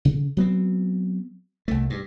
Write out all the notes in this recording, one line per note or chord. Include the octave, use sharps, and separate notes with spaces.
C#3
F#3 B3 C4
C2 A3
G2